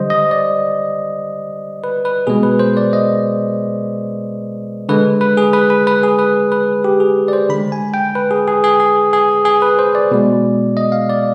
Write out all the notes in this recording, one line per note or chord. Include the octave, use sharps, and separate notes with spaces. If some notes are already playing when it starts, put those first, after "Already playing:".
Already playing: D3 G3 C5 D#5
D#5
D5
B4
B4
B2 G#3 G#4
B4
C5
D5
D#5
D3 G#3 B4
B4
G#4
B4
B4
B4
G#4
B4
B4
G4
G#4
D5
C5
D3 G#3 B5
G#5
G5
B4
G#4
G#4
G#4
G#4
G#4
G#4
B4
C5
D5
B2 G#3
D#5
F5
D5